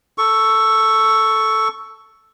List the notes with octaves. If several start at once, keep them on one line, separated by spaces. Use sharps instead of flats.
A4 C#6